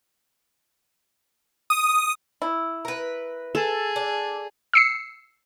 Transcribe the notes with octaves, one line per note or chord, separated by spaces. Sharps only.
D#6
E4
A#4 B4
G#4 A4
D4
E6 C7 C#7